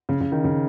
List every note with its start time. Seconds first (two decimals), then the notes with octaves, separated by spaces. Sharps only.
0.09 C#3
0.21 C#3
0.32 D#3
0.44 C#3